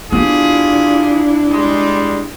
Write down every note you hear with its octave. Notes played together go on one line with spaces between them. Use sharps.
B3 D4 E4 F4 G4 G#4
G3 G#3